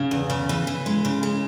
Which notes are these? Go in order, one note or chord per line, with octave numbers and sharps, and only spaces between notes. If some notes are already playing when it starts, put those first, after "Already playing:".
Already playing: C#3
E2
C#3
E3
E3
G#3
C#3
G#3